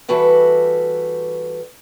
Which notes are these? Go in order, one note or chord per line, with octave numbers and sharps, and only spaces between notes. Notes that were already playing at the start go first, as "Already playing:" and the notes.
E3 G3 F#4 A4 B4 G5